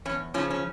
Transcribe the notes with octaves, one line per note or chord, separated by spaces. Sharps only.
E2 C#4
C#3 F3 C#4
C#4